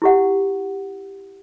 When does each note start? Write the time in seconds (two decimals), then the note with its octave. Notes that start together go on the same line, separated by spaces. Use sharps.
0.02 E4 G4 F#5